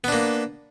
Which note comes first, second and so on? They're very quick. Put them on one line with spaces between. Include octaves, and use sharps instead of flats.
B3 D4 A#3